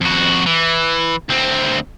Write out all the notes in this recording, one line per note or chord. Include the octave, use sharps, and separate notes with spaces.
F2 F#4
E3
D2 C4